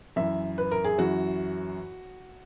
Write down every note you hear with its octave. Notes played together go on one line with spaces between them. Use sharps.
F#2 E3 E5
B4
A#4
G#4
F#2 E3 F#4